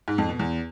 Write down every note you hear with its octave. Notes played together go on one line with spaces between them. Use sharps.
G#2
F2
B2
E2